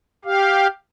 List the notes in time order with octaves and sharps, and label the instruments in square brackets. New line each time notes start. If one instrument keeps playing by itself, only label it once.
[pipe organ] G4 F5